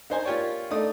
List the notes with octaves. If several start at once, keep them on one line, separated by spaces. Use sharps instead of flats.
D#4 C5 G#5
A#3 F4 G4 C#5 D5
A3 D#4 D5 D#6